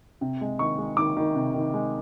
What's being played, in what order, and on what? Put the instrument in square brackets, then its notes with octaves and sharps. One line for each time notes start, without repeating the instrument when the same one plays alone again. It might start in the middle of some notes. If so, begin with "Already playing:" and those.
[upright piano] C3
G#3
D#3 C#6
G#3
D#3 D6
D#3
C3
D#3
G#3